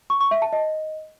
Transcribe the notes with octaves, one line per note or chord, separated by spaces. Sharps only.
C#6
C#6
E5
A5
D#5